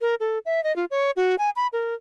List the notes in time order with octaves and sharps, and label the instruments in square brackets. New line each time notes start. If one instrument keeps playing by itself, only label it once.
[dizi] A#4
A4
E5
D#5
F4
C#5
F#4
G#5
B5
A#4